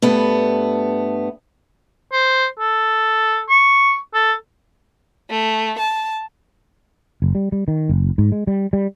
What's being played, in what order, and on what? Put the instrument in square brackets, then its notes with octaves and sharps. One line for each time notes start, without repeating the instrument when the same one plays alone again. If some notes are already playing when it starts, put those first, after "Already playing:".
[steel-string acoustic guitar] G2 A3 B3
[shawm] C5
A4
C#6
A4
[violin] A3
A5
[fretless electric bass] F#1
G3
G3
D#3
F#1
G#2
G#3
G3
G3